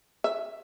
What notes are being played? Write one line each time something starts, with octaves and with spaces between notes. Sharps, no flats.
E5